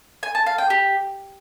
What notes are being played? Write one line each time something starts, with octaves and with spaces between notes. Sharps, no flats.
G#5
A5
F5
G5
G4